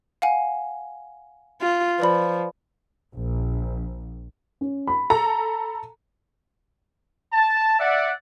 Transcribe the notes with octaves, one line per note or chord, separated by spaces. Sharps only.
F5 F#5 G#5
F4
F3 B4 D5 B5
A#1
C#4
B5
A4 A#5
A5
D5 E5 F#5